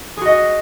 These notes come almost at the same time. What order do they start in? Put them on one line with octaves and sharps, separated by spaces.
G#4 F#4 D#5